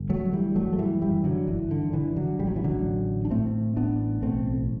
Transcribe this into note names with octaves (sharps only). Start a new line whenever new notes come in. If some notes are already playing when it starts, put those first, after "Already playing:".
Already playing: G1
D3 F#3 A3
E3 G3
G1 F#3 A3
A3
E3 G3
F#2 E3 G3
D3 F#3
G1 E3
D3
D3 E3
D3 F#3
A1 G3
F#3
E3
D3 F#3
A2
D4
A2 A3 C4
A1 B3 D4
B1 A3 C4